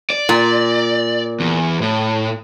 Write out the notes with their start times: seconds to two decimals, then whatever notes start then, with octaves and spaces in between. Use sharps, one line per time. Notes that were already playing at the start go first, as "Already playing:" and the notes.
0.10 D5
0.29 A#2
1.40 E2
1.82 A2